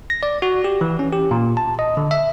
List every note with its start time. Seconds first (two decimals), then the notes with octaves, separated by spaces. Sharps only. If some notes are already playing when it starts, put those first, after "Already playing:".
0.10 A#6
0.23 D5
0.42 F#4
0.64 G4
0.81 E3
0.99 C#4
1.13 G4
1.31 A#2
1.57 A5
1.79 D#5
1.97 D3
2.11 E5